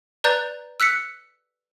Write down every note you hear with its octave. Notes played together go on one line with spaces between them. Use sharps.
B4 D5 A#5 F#6 G6 A6
E6 F#6 B6 C#7